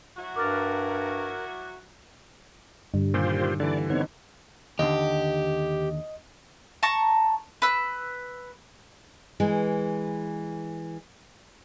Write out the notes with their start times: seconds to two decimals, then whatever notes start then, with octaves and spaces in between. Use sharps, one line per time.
0.17 F#3 E4 F#4
0.36 G2 A#4 D6 F6 A6
2.94 G2 D3 G3
3.14 A#2 D#3 A#3 F4 G4 C5
3.60 D3 E3 D5
3.90 B3 C4 D#4 C#5
4.79 D#2 D3 G4 D#5
6.83 A5 A#5 C#6
7.62 B4 E6
9.40 E3 G#3